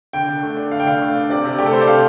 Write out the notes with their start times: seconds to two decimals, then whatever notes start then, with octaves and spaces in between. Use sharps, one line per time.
0.13 D3 G5
0.29 D3
0.43 A3
0.57 D4
0.71 D3 F5
0.80 G5
0.87 D3 F5
1.01 A3
1.16 D4
1.30 C3 D5
1.45 C3
1.59 A3 G4
1.66 A4
1.73 D4 C5
1.81 D5
1.87 C3 F5